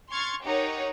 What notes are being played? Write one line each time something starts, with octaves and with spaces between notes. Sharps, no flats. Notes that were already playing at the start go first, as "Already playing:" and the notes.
C6 C#6 F6 G#6 A6
D#4 G4 A#4 C#5 F#5 A#5